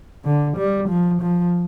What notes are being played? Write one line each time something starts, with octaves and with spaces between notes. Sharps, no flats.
D3
G3
F3
F3